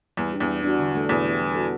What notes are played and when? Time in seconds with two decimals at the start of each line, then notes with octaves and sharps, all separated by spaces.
0.17 E2 G3
0.33 D4 G4
0.40 E2
0.48 G3
0.63 D4 F#4
0.79 D3
0.94 A3 D4 A4
1.09 E2 B2
1.25 A3 E4 G4
1.40 G3
1.55 B3 F#4 A4